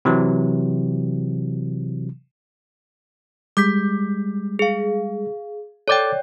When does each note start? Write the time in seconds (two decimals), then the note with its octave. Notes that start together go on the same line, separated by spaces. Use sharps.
0.05 C3 E3 F#3
3.57 G3 G#3 D6 G6 B6
4.59 G#4 F5
5.88 A4 C#5 D5 G5 D6 A6